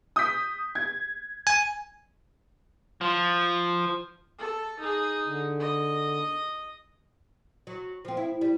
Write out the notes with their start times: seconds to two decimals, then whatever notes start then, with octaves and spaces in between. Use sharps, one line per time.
0.16 D#6 G6 B6
0.75 G#6
1.47 G#5
3.01 F3
4.39 A4
4.79 D#4 G#4
5.26 D3
5.59 D#5
7.67 F#3
8.05 F3 C4
8.17 E4
8.41 G3